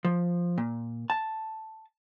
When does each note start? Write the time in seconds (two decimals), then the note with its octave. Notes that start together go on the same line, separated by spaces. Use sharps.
0.04 F3
0.58 A#2
1.10 A5